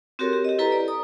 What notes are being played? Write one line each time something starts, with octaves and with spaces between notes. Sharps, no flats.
C4 F#4 G4 A4 A#4 C#5
G4
G4 D#5
E4 A4 B4 A#5
D5
A#5 D#6